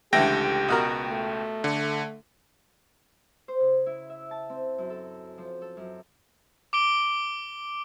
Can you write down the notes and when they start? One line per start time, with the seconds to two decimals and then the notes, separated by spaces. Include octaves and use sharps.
0.13 C#2 D3 E3 A3 G4 G5 A#6
0.68 B2 F#4 A#4
1.08 A3
1.64 D3
3.48 C5
3.60 C#3
3.86 E4
4.09 E5
4.31 A5
4.50 C4
4.78 F#2
4.90 A4
5.38 F3
5.62 A4
5.77 F#2
6.73 D6 D7 G7